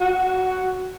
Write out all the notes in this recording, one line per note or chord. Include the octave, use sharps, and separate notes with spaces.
F#4